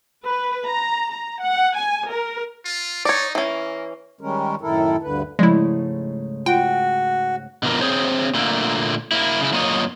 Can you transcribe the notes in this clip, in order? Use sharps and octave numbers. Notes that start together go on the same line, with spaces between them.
B4
A#5
A#5
F#5
G#5
A#4
F4
D#4 C#5 D5
E3 A#3 C#4
D#3 G3 G#3 C#4 A#4
F#2 A2 D#3 E4 A4 A#4
D2 G2 D3 B4
G#2 C#3 F3 G#3 A3 E4
F4 F#4 G5
B2 D3 E3 F3 A#4
C4 G#4 C5 C#5
A#2 D3 A3 A#3
A#3 E4
C#3 E4
F#2 A#3 F4 C#5 D#5